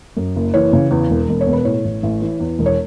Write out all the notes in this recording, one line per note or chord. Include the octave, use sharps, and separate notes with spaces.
F#2
F#1
E3 C#5
C#3
E2
E1
E1
C#5
B2
B4
A2 C#5
A1
A1
E3
E2
E1
C#5